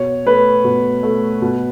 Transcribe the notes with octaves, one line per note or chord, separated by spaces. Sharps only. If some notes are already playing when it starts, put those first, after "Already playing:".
Already playing: B2 C#5
A3 B4
B2
A3
B2